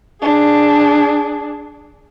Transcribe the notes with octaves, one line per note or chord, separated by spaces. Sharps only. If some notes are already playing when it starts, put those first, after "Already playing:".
D4 G#4